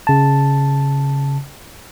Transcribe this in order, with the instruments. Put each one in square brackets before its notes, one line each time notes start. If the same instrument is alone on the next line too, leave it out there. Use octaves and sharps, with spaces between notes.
[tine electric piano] C#3 A5